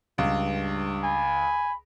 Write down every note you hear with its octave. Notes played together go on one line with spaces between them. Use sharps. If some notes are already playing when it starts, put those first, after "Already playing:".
C#2 G2
G#5 B5